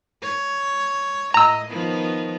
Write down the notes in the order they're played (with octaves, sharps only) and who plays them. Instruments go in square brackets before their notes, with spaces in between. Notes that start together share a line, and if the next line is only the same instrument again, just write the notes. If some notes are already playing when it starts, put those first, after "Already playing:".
[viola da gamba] C#5
[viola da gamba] A2 D#5 [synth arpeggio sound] A#5 E6
[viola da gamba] D#3 F3 B3